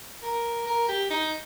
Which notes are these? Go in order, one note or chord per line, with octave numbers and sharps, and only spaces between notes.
A#4
A#4
G4
D#4